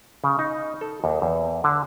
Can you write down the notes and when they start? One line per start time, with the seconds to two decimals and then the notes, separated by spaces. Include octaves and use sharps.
0.24 C#3
0.39 D#4
0.81 A4
1.04 D#2
1.22 E2
1.64 D3